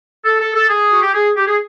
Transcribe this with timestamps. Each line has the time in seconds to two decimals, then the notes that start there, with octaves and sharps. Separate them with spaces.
0.25 A4
0.40 A4
0.54 A4
0.69 G#4
0.91 F#4
1.02 G4
1.14 G#4
1.36 G4
1.47 G#4